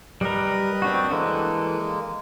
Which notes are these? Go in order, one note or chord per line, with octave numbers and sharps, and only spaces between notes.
G3 A#4 B4 D#5
C4 D4 F#4
E3 G#3 A#3 A4